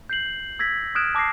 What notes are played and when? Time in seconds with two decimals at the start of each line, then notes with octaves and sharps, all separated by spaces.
0.10 G6 C7 F#7
0.59 E6 G#6 A#6 B6
0.95 D#6 F6 F#6 G#6 D7 E7
1.15 A5 D6 G#6 A#6 C7